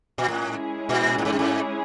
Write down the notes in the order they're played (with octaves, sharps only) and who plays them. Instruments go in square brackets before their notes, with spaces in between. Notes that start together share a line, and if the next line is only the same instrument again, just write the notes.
[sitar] A#2
[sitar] A2 [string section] G#3 C#4 E4 G#4
[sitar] A#2
A2
G#2
G2
G#2